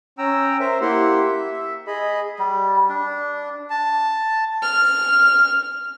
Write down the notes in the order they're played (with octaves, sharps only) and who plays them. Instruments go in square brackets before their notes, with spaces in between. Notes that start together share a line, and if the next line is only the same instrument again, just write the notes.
[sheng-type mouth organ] C#4 G5 A#5 E6
A#4 C5 E5
A#3 E4 G4 F#5 C6
E5
G#4 D#5 B5
[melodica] G3
D4
[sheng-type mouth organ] A5
[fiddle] F6